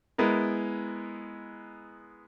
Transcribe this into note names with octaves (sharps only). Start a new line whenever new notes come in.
G#3 B3 E4 A#4